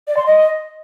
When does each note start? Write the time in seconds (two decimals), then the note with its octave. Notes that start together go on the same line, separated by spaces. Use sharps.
0.08 D5
0.17 C6
0.26 D#5